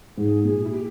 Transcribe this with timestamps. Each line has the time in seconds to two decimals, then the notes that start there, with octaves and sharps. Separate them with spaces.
0.17 G#2 G#4
0.44 A#2 G#4
0.64 E4
0.71 G4